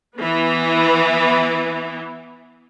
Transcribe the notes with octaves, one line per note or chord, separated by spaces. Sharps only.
E3 B3